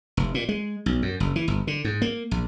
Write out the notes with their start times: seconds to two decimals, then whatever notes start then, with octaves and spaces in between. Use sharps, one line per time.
0.17 F1
0.34 A#2
0.49 G#3
0.86 B1
1.02 F#2
1.20 F#1
1.36 E3
1.48 G1
1.67 D3
1.85 G#2
2.02 A#3
2.31 A#1